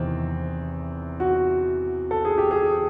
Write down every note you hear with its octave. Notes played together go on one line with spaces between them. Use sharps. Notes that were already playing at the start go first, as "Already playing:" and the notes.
Already playing: E2 C3 D#3 C4
F#4
A4
G#4
G4
G#4